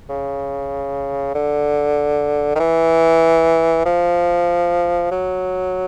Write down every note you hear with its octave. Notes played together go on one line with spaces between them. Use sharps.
C#3
D3
D#3
E3
F3
F#3